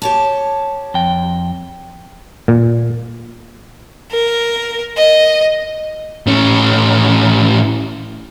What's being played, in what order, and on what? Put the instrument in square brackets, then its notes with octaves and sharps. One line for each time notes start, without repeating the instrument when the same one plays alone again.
[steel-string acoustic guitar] G4 C#5 A5
[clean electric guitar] F2 G5
[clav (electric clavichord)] A#2
[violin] A#4
D#5
[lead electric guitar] A2 C#4